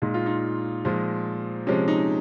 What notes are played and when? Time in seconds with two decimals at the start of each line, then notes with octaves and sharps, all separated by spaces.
0.02 A#2 G#3 D#4
0.14 F4
0.26 D#4
0.85 A#2 F3 G#3
1.67 C3 F3 G#3 C#4
1.88 D#4